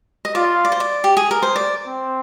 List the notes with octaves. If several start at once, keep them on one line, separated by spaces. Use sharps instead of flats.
D#5
F4 D5
D5
C5
D5
G4
G#4
A#4
C5
D5
C4